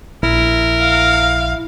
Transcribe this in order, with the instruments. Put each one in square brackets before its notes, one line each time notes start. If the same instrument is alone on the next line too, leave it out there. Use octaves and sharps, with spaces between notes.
[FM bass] A#1 [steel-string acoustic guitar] E4 [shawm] A#4
[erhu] F5